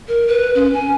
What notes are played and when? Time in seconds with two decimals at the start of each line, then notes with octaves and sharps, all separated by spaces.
0.08 A#4
0.27 B4
0.55 C#4
0.73 G#5